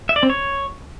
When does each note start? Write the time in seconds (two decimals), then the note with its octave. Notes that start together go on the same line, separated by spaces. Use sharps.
0.09 E5
0.16 D5
0.23 C4
0.30 C#5